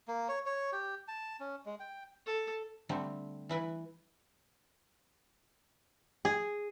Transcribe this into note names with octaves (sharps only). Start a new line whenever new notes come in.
A#3
C#5
C#5
G4
A5
C#4
G#3
G5
A4
D3 G3 A3 C4
E3 E4 B4
G#4